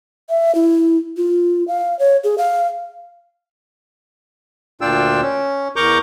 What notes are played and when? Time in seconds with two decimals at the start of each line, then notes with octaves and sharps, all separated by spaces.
0.29 E5
0.55 E4
1.17 F4
1.68 F5
1.99 C#5
2.24 G#4
2.38 F5
4.81 D2 A#2 D4 F4 G5 E6
5.21 C#4
5.76 E2 A#4 A#5 C#6 D6 G6